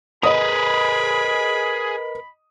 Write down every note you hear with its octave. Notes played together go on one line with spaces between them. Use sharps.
G#4 A#4 B4 D#5 B5 D#6